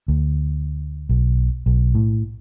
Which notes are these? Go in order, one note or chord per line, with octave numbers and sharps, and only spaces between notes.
D2
B1
B1
A2